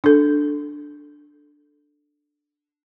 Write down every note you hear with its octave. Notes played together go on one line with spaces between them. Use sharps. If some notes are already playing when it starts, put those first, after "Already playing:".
D4 A4